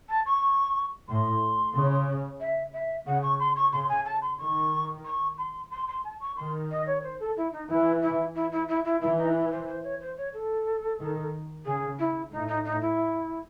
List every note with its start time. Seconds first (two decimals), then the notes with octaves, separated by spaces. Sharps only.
0.09 A5
0.26 C#6
1.08 A2 C6
1.75 C#3
2.40 E5
2.74 E5
3.06 C#3 F#5
3.23 C#6
3.40 C6
3.56 C#6
3.73 C#3 C6
3.89 G#5
4.06 A5
4.22 C6
4.39 D#3 C#6
5.05 C#6
5.38 C6
5.71 C6
5.88 C6
6.04 A5
6.20 C#6
6.37 D#3 C6
6.71 D#5
6.86 C#5
7.03 C5
7.20 A4
7.37 E4
7.53 D#4
7.69 E3 E4
8.02 E4
8.35 E4
8.52 E4
8.68 E4
8.85 E4
9.01 E3 E4
9.17 D#4
9.34 E4
9.51 C5
9.67 C5
9.83 C#5
10.00 C5
10.17 C#5
10.33 A4
11.00 D#3
11.65 C#3 G#4
11.99 E4
12.31 A2 D#4
12.48 D#4
12.65 D#4
12.81 E4